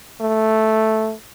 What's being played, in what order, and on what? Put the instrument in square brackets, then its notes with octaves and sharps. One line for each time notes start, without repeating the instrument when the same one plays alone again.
[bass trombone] A3